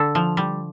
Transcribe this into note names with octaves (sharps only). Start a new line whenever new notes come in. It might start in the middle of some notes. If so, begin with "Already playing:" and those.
Already playing: D3 A4
F3
G3